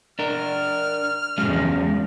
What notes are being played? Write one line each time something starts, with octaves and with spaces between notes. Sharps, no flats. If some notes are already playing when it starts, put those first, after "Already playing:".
D4 A#4 F6
E2 F3 F#3 G#3 C#4